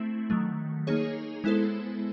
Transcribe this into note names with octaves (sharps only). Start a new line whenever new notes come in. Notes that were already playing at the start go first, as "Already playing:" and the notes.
Already playing: A3 C4 E4
D#3 F#3 A3
A#3 D#4 G#4 C#5
G#3 B3 E4 A4 C5